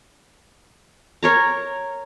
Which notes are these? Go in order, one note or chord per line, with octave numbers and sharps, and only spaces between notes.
A#4 C#5 A#5